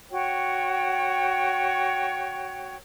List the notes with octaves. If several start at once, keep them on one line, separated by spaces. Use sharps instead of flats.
F#4 C#5 G5